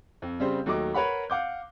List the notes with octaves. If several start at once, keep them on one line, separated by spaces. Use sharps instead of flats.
F2
C#3 G3 C4 C5
D#2 F#3 A3 D#5 D6
A#4 B4 C#5 F#5 B5
F5 F#5 D6 G6